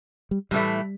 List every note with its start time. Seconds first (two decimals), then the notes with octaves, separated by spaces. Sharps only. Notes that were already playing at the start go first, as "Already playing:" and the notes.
0.31 G3
0.51 A2 E3 G3 A3